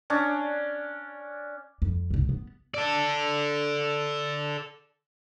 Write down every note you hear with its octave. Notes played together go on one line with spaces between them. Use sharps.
C#4 D4
F2
C2 D3
B3
A4 D5